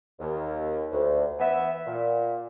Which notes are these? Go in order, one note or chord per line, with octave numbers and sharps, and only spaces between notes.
D#2
D2
E3 B3 E5
A#2